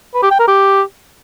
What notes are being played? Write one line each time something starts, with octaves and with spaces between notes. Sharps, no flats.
B4
G4
G5
A#4
G4